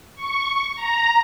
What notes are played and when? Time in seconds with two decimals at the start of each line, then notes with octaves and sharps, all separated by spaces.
0.15 C#6
0.75 A#5